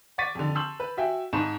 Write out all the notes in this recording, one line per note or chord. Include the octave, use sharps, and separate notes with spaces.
F#5 C#6 D6 A6 B6 D#7
F2 D3
A5 C6 C#6 E6 G6 F#7
B4
F#4 E5 G5 G#5
G#2 D#4 A5 B5 C#6 E7